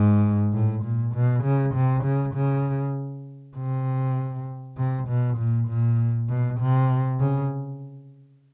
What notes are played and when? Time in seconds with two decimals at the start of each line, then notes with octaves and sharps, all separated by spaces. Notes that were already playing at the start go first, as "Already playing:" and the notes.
Already playing: G#2
0.53 A2
0.84 A#2
1.14 B2
1.44 C#3
1.75 C3
2.04 C#3
2.35 C#3
3.57 C3
4.78 C3
5.08 B2
5.38 A#2
5.68 A#2
6.29 B2
6.60 C3
7.20 C#3